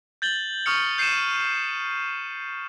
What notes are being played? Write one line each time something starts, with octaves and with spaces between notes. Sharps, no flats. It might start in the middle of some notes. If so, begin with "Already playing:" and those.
G6 A6 F#7 G7
C#6 D#6 F6 C#7
G6 C7 C#7 D#7 E7